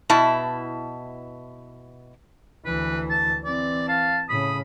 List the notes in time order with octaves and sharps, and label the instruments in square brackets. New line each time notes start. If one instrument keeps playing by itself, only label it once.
[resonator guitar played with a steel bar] B2 E4 A5
[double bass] D2 E3 [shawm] B4
[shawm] A5
[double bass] E3 C4 [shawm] D5
[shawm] F5 [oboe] A5
[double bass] A2 C#3 [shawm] B5 [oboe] D#6